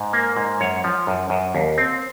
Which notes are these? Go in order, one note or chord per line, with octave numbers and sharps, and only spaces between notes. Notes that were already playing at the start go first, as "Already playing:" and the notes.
Already playing: G#2
A#3
G#2
F#2 C#5
F3
F#2
F#2
D#2
C4